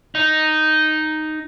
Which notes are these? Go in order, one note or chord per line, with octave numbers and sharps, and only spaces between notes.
D#4